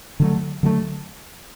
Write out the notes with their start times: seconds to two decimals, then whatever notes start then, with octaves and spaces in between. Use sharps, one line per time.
0.20 D3 F#3 A3
0.63 D3 F#3 A3